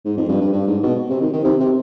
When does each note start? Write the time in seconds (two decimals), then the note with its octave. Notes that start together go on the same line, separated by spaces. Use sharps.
0.05 G#2
0.17 F2
0.29 G2
0.41 G2
0.53 G2
0.67 G#2
0.83 B2
1.10 C3
1.21 D#3
1.33 D#3
1.44 C3
1.60 C3